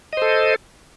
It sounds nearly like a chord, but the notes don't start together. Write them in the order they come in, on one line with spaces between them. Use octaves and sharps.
D#5 C5 A4